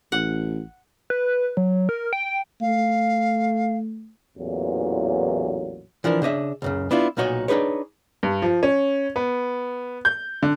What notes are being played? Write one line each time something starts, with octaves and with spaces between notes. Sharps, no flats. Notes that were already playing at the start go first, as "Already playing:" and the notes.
A1 F#5
B4
F#3
A#4
G5
A3 F5
A1 E2 A#2 F#3
E3 F3 D4 A#4
C#3 D4 D#5 E5
C#2 F#2 C#3
B3 D4 E4 F4
B1 A#2 D#4 F#4 C#5 D#5
D4 D#4 G#4 B4 C#5
G2
F3
C#4
B3
G6
D3